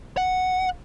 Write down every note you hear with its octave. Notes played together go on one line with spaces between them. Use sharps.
F#5